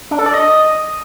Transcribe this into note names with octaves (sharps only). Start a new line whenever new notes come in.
D4
A4
D5
D#5